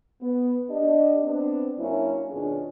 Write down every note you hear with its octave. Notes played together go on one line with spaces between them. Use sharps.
B3
D4 G4 D#5
B3 C4 D4
F#2 A#3 C#4 D4 E4
D#2 B2 C#4 D4 F4 G#4